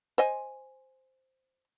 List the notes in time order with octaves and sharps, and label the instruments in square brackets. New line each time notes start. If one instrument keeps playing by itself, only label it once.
[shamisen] C5 D#5 G#5